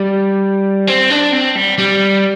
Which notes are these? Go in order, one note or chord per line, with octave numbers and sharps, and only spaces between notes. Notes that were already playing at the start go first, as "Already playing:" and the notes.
Already playing: G3
C4
D4
C4
G3
G3